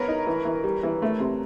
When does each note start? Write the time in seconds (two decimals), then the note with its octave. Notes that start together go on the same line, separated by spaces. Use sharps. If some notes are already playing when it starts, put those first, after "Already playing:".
Already playing: B3 A#4 B4 C#5
0.08 D#4
0.27 E3
0.45 E3
0.64 G3
0.83 E3
1.02 A3
1.20 C3